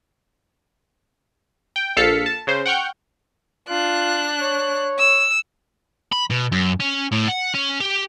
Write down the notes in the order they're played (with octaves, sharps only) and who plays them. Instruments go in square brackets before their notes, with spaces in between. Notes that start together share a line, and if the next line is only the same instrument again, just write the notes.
[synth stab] G5
A#1 A4 F5 B6 C#7
A5
C#3 C5
F#5 G5 C#6 F6 G6
[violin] D4 F#6 [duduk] F4
[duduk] C#5
[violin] E6
[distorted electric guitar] B5
B2
F#2
C#4
A2
F#5
C#4
G4